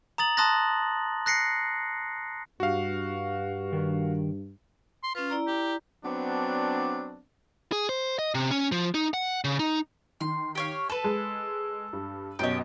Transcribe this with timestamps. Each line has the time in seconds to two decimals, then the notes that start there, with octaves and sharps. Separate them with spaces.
0.18 A#5 D#6 A6 F#7
0.37 A5 C6 D#6 F#6 A6 A#6
1.26 F#6 A#6 C7 C#7
2.60 G2 F#4 F5
3.72 D#3 A#4
5.03 C6
5.15 C#4 F4 B4
5.30 E4 D5 A#5
5.47 G4
6.04 F#3 B3 C4 D4
7.72 G#4
7.89 C5
8.19 D#5
8.35 C3
8.51 C#4
8.72 F3
8.94 D#4
9.14 F#5
9.44 C#3
9.59 D#4
10.21 D#3 C6
10.55 G4 C#5 F5
10.90 A4 B4 A5
11.04 G#3
11.93 G2
12.39 F#2 B2 G4 C#5 D#5